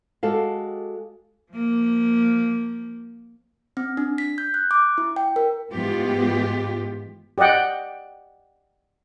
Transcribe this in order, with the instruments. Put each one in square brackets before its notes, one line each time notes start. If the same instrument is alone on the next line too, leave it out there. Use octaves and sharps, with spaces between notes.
[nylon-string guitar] G#3 F#4 G4 A4 F5
[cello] F3 A#3
[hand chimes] C4
D4
B6
G6
F#6
D6
E4
G5
A#4
[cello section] G#2 E3 G#3 B3 F4 G4
[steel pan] G4 D5 D#5 F#5 G5